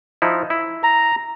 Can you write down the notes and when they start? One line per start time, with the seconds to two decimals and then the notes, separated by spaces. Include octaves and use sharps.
0.22 F3 D#4 E4
0.50 E4
0.83 A#5